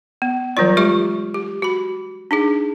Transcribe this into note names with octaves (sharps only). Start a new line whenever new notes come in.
B3
E3 F#3 G3 F4 D5
G#3 F4 G4 C#6
G4
F#4 B5
D4 D#4 G#4